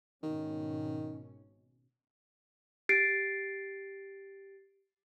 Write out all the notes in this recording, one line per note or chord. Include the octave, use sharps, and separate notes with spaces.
G#1 B2 D#3 C#4
G4 A6 C7 D7